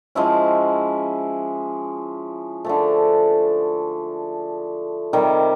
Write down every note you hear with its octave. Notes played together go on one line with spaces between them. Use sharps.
F3 G#3 C#4 E4
D3 F3 A3
C3 D#3 G3